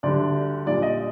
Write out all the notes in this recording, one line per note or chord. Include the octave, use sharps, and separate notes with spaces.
D2 D3 G3 D5
A#1 A#2 G3 D5
D#5